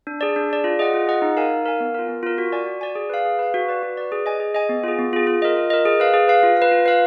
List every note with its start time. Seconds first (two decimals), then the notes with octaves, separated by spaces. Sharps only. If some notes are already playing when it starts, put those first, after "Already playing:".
0.07 D4
0.21 G#4 D5
0.36 D4
0.50 G#4 D5
0.64 F4
0.79 G#4 D#5 F#5
0.94 F4
1.07 G#4 D#5 F#5
1.22 D#4
1.37 A#4 F5 G#5
1.50 D#4
1.66 A#4 F5 G#5
1.80 B3
1.94 F4 A#4
2.09 B3
2.23 F4 A#4
2.38 F#4
2.53 D5 G#5
2.67 F#4
2.81 D5 G#5
2.95 G#4
3.10 B4 F5
3.25 G#4
3.39 B4 F5
3.54 F#4
3.68 B4 D5
3.83 F#4
3.97 B4 D5
4.12 G#4
4.26 D#5 G#5
4.40 G#4
4.55 D#5 G#5
4.69 B3
4.83 F4 G#4
4.99 B3
5.13 F4 G#4
5.27 F4
5.42 A#4 D#5
5.56 F4
5.70 A#4 D#5
5.85 G#4
6.00 B4 F5
6.14 G#4
6.28 B4 F5
6.43 F4
6.57 F5
6.62 B4
6.72 F4
6.86 B4 F5